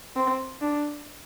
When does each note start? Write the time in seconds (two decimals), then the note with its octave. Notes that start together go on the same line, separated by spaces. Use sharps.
0.16 C4
0.62 D4